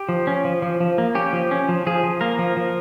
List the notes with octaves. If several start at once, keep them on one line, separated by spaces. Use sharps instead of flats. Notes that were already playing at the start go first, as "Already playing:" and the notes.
Already playing: G4
F3
C#4
F3
F3
F3
A#3
C#4 G4
F3
C#4
F3
F3 G#4
F3
A#3 A#4
F3
F3